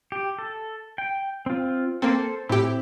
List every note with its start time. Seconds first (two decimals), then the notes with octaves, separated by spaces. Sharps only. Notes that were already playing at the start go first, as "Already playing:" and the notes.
0.12 G4
0.39 A4
0.98 G5
1.46 C4 F4
2.02 A#3 C4 A4 C5
2.49 A2 C4 E4 G4